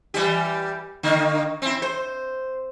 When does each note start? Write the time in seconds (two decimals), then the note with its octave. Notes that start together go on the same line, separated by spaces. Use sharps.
0.14 E3 G3 G4
1.03 D3 D#3 A#3
1.62 C4 E4
1.82 C5